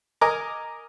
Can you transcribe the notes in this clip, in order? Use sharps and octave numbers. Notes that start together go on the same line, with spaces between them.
A#4 D#5 G#5 A#5 D6